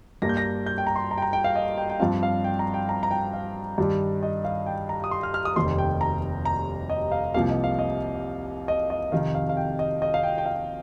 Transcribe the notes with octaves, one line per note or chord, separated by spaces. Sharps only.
G2 G3 A#3 A#6
G6
A#6
G6
G5
A#5
C6
A#5
G5
A#5
G5
F5
D#5
G5
G5
G2 F3 C4 F5
F5
G5
A#5
G5
A#5
A#5
G5
F5
G2 D#3 G3
D#5
F5
G5
A#5
D#6
C6
F6
F6
D#6
F1 D#2 D#3 G3 C6
G5
A#5
A#5
D#5
F5
C2 C3 F3 A#3 F5
D#5
F5
D#5
D#5
D#5
F2 C3 D#3 F5
F5
F5
G5
D#5
D#5
F5
G5
G5
F5